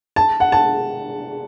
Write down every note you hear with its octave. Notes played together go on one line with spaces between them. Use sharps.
A5
F#5
A5